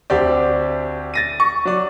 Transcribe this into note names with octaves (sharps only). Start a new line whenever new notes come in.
D2 C4 G4 D5
A6 A#6 D#7
C#6
F#3 D5